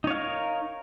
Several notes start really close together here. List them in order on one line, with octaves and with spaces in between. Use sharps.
D#4 C#5 F5 A#4